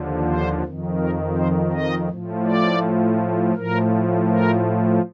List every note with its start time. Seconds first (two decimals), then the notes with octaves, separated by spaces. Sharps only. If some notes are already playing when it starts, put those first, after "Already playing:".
Already playing: D#2 D3 F3
0.27 C5
0.62 F2 D#3
1.00 A#4
1.37 C5
1.73 D#5
2.10 A2 F3
2.46 D5
3.56 A2 F3 A#4
4.29 A#4